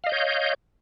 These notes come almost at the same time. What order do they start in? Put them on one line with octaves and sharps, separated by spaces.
F5 D#5 G6 C#5